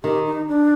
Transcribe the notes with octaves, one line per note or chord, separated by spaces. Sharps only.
D#3 G4
D#4
D4